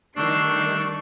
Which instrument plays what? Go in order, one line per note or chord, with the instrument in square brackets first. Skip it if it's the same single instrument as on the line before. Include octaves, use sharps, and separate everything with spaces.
[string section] D#3 G3 C7 [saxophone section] A3 D4 [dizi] C#6